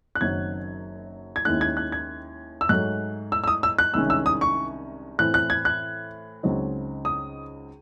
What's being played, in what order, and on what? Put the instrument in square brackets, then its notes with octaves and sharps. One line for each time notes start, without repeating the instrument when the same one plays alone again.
[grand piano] F#6
F#1 F#2 D#3 F#3 C4 G#6
G#6
D#2 D#3 G#3 C#4 E4 F#6
G#6
F#6
G#6
E6
G#2 F#3 A3 F#6
E6
E6
D#6
E6
F#6
C2 C3 D#3 G#3 C#4 E6
E6
D#6
C#6
A2 E3 C4 F#6
F#6
G#6
F#6
C#2 C#3 F#3 C4 D#4
D#6